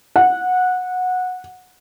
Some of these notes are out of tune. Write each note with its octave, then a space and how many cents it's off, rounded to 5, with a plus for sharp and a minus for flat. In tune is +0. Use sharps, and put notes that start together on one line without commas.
F#5 -15